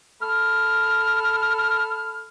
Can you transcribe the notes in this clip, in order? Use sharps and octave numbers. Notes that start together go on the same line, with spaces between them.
A4 B5 F6